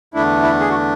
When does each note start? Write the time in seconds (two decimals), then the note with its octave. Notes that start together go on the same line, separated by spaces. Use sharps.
0.14 E2 D3 A3 D4 E4
0.42 E4
0.60 G#4
0.70 F#4